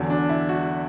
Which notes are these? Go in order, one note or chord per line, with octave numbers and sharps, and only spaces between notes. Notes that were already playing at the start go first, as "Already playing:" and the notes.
Already playing: E2 D3 F#3
D4
E4
F#4